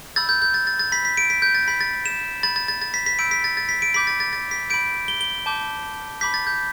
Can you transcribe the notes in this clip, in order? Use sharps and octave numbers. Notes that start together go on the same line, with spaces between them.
B5 E6 G6 A6
G6
G6
A6
A6
A6
B5 G6 B6
B6
D7
B6
G6
A6
B5 G6 B6
A6
E7
B5 G6 A6
A6
A6
A6
B6
B6
B5 E6 G6 D7
B6
A6
A6
B6
D7
B5 D6 G6 B6
A6
A6
A6
B6
B5 G6 D7
G7
G7
A5 D6 G6
B5 D6 G6 B6
A6
G6